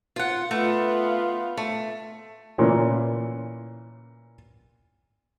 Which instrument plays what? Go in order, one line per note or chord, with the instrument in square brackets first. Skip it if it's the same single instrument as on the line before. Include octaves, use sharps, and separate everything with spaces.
[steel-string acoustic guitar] F4 F#5
[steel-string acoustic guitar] A3 [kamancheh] B3 F4
[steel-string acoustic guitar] A3
[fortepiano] A#2 C#3 E3 C#4